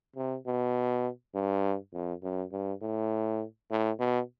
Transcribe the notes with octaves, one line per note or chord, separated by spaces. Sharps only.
C3
B2
G2
F2
F#2
G2
A2
A2
B2